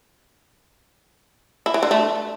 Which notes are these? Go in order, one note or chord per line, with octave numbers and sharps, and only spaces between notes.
E4
E3
D3
A3